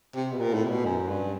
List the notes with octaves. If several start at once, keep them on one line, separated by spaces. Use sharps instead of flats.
C3
B2
A#2
A2
C3
B2
F#2
G2